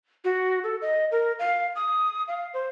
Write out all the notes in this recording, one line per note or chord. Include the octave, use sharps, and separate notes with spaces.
F#4
A4
D#5
A#4
F5
D#6
F5
C5